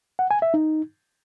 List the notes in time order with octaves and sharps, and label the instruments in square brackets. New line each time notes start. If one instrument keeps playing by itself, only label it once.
[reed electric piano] F#5
G#5
E5
D#4